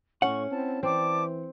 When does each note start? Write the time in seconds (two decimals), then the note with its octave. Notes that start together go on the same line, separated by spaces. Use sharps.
0.22 A2 C#4 F#5 C#6
0.51 C4 E4 A5
0.83 E3 C4 D5 A5 D6